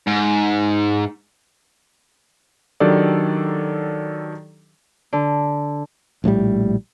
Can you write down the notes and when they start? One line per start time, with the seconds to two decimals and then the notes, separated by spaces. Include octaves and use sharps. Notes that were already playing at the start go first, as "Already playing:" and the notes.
0.07 G#2
2.80 D#3 F#3 D4 G4 A4 D5
5.13 D3
6.24 A#1 A2 D3 G3